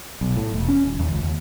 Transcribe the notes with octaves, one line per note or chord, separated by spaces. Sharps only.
B1
A2
E1
C#4
D#1
D#2
C#2
D#2